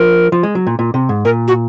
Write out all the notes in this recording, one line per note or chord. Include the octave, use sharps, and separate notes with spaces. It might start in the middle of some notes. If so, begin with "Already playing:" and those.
Already playing: F3 A#4
F3
G#3
F#3
A#2
A#2
C3
G#2
A#2 A#4
F#4